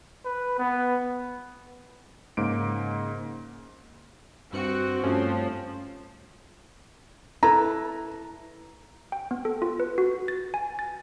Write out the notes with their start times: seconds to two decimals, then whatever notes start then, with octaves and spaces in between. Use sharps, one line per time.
0.25 B4
0.59 B3
2.37 G#2 C#3 A#3 D7
4.53 G2 C4 F#4 F#6 C#7
5.04 G2 F3 A3 C#4
7.43 E4 A4 B4 A#5
9.12 G5
9.31 B3
9.45 A4
9.62 F4
9.80 B4
9.98 F#4
10.28 A6
10.54 G#5
10.79 A6